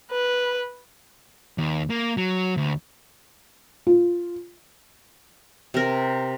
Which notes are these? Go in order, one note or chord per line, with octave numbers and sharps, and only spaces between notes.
B4
D#2
A#3
F#3
D2
F4
C3 A#4